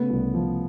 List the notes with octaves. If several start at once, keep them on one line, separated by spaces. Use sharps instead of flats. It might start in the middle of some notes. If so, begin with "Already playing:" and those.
Already playing: C#3 A3 B3
C2
F3